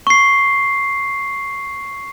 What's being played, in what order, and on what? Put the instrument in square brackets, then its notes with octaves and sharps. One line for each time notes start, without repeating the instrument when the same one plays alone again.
[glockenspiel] C#6 C7